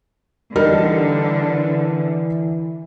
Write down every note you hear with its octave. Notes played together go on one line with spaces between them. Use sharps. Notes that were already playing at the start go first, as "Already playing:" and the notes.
D3 E3 G3 D#4 A#4